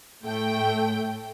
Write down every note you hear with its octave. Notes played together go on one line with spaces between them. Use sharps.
A2 A3 G5